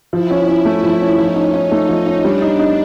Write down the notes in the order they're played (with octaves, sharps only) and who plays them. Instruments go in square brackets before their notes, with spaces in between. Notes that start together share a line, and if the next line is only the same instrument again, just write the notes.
[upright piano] F3 [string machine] E4
[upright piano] C#4
C#4
A3
F3
C#4
[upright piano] F3 [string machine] D#4
[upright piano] C#4
C#4
[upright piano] A3 [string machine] D#4
[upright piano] F3
C#4
[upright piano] G3 [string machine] D4
[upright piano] D#4
D#4